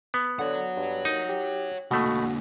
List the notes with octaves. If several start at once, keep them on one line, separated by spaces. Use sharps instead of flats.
B3
D3 C#5 F#5
G2
D#2 D#4
G4
B2 D3 A3 A#3 F#4